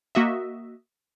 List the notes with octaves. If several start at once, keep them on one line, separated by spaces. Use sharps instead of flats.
A#3 F#4 D#5 E5